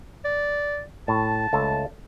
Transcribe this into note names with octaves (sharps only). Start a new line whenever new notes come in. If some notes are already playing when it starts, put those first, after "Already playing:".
D5
A2 A5
C#2 A3 A4